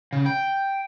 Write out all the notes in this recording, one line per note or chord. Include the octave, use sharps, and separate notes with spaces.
C#3
G5